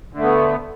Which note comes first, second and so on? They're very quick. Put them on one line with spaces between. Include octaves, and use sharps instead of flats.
D3 A3 B3